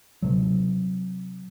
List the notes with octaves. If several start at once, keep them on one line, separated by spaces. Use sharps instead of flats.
C3 F#3